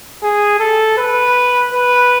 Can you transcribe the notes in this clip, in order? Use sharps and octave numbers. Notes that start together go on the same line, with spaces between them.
G#4
A4
B4
B4